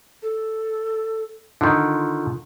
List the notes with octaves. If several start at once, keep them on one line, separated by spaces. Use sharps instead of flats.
A4
D3 D#3 F4